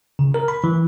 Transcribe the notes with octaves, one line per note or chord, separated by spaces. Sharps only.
C#3
A#4
B5
E3